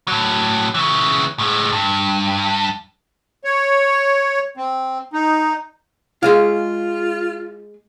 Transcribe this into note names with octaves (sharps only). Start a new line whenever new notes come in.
A2 F#3
C#3 E3
A2 G#3
G2
C#5
C4
D#4
G#3 F4 G#4 F5